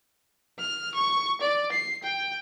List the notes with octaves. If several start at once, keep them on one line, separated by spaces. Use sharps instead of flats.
F6
C#6
D5
C7
G5